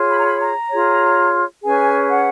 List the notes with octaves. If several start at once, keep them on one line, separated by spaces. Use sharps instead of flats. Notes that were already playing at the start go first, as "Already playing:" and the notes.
Already playing: F4 G#4 C#5
B5
A#5
B5
A#5
F4 G#4 C#5
C#4 G#4 B4 G#5
F#5